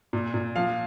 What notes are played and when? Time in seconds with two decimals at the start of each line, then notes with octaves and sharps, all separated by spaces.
0.13 A#2
0.34 A#2
0.56 F3 F5